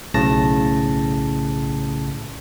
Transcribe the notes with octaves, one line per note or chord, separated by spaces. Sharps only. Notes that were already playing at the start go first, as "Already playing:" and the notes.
B1 A2 C#3 A5 A#6